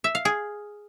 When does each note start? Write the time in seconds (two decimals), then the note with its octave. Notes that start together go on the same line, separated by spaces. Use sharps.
0.04 E5
0.15 F5
0.25 G#4